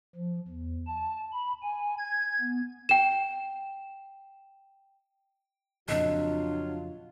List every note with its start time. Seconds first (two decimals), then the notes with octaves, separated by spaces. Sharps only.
0.15 F3
0.47 E2
0.87 A5
1.32 B5
1.63 G#5
1.99 G#6
2.41 B3
2.89 G5 E7
5.88 F2 A#2 C#3 F#3 D4 F4 D#5 E6